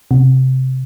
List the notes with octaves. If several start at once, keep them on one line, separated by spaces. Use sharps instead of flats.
C3